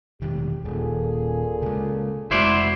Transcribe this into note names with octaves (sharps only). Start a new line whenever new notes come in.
E1 D#3 G4
D#1 A#2 G#4 A4
C#3 G#3
F1 G#3 E4 F#4 C5 D5